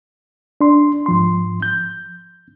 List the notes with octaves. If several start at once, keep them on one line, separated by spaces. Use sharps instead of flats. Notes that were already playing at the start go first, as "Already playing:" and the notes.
D4 C6
G#2 F3 C6
G6